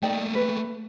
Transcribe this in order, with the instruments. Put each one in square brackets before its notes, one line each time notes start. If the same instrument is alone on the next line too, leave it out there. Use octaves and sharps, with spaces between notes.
[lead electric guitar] A3 A#3 [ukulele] D#4 D5 G5
[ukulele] B4